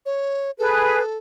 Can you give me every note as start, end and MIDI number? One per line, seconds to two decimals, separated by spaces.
0.06 0.51 73
0.59 1.01 68
0.59 1.18 69
0.59 1.01 71